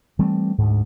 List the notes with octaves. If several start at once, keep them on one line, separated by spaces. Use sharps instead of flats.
E3 G3 A3 C4
D2 G#2